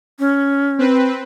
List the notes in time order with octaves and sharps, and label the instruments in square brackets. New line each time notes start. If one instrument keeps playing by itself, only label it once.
[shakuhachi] C#4
[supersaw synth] C4 B4